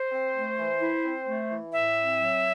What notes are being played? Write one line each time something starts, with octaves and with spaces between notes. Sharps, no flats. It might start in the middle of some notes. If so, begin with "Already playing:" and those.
Already playing: C5
C4
A3
E3
E4
C4
A3
E3
A2 E5
C4
F#3